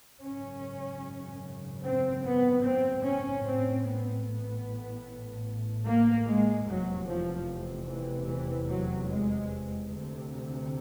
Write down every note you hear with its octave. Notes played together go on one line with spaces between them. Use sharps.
G#1 F#2 C#3 C#4
C4
B3
C4
C#4
A1 A2 C4
B3
B3
A#3
G#3
F1 E2 C3 F#3
F3
E3
E3
F#3
G#3
D2 C3